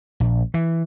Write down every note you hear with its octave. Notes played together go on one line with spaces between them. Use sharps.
A#1
E3